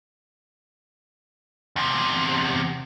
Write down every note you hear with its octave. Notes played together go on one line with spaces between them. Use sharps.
E2 C3